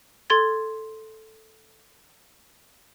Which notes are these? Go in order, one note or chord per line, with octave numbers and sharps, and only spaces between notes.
A4 C6 G#6 A6